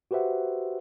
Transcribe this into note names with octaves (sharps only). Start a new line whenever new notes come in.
F#4 G4 B4 C5 E5 F#5